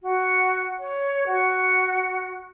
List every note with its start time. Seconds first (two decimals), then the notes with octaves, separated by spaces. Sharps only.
0.02 F#4
0.79 C#5
1.26 F#4